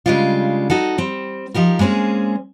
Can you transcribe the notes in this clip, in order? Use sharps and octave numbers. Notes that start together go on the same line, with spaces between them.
C#3 G3 G#3 D4 F4
D#4 F#4 A4
G3 C4
F3 D#4 G4 A#4
G#3 A#3 C4 C#4 G#4